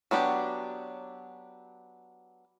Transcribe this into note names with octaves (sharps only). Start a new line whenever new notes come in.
F#3 B3 D4 G4